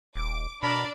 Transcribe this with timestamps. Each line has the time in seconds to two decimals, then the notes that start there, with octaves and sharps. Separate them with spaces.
0.16 D#1 D6
0.63 B2 D4 A#4 D5 B5